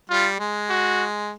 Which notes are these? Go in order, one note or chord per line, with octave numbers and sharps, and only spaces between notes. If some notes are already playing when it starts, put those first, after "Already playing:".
G3 F4
G#3
F#4